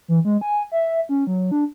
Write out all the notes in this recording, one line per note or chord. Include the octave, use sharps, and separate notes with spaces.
E3
G#3
G#5
E5
C#4
F#3
D4